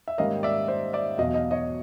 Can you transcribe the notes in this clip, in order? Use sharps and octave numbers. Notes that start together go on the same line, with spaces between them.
E5
G#2 D#3 G3 A#3 C#4 D#5 F5
D5 E5
C5 D5
D5 E5
E2 B2 F#3 D#5 F5
D#5 F5
C#5 D#5